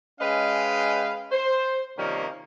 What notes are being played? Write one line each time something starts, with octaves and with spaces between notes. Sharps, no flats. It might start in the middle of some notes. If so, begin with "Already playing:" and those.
G#3 C#4 B4 D#5 F5 G5
C5
C3 D#3 F3 G3 A#3 C#4